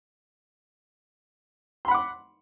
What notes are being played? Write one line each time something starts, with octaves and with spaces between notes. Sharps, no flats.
F#5 B5 C6 D6